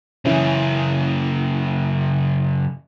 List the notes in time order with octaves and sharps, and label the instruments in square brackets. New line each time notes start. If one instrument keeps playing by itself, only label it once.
[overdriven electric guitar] F#2 C#3 [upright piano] E3 C#4